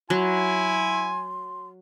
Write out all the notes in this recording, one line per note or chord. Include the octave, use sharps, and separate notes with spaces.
F#3 E4 G#5 C6